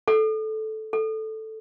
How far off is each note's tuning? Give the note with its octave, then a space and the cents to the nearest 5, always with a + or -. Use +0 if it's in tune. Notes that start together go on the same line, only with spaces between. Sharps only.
A4 -10
A4 +0